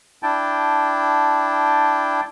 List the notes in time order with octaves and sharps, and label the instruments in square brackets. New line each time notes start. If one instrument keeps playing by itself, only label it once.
[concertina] D4 E4 G5 A5